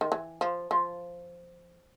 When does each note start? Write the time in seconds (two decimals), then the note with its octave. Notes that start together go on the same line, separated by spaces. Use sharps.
0.01 D#3
0.12 E3
0.41 F3
0.71 F3